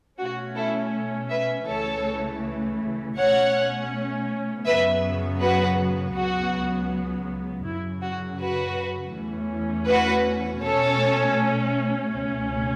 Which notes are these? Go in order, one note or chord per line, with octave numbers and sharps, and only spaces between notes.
B2 A3 C#4 F#4
E4 A4
B4 E5
C#2 C#3 E3 A3 A4 C#5
B2 A3 C#4 C#5 F#5
F#2 C#3 F#3 B3 B4 E5
F#4 B4
C#2 C#3 F#3 B3 F#4
F#2 C#3 F#3 E4
F#4
F#4 B4
E2 E3 A3 C#4
F#4 B4
B2 A3 C#4 A4 C#5
C#2 B2 A3 C#4